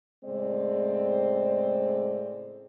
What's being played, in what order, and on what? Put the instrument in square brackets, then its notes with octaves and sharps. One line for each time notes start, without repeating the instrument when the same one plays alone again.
[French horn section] A2 C#3 G#3 C4 D5